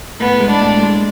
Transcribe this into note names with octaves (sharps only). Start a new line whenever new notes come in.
A2 B3
G#3
D4
A2
G#3